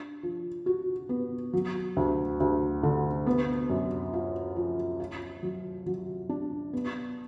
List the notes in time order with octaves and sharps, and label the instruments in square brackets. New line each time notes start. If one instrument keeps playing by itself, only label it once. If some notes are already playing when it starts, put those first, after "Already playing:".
Already playing: [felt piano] D4
F3
F#4
B3
F#3
D2
D2
D3
B3
F#2
F4
F3
F4
F#3
F#3
D4
B3